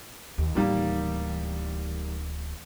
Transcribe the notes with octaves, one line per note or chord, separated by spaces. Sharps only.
D#2
D1 D#3 E3 G3 A#3